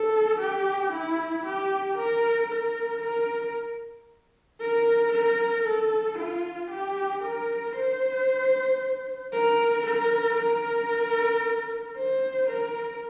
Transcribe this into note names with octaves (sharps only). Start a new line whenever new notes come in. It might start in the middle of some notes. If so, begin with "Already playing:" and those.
Already playing: A4
G4
E4
G4
A#4
A#4
A#4
A#4
A#4
A4
F4
G4
A#4
C5
A#4
A#4
A#4
C5
A#4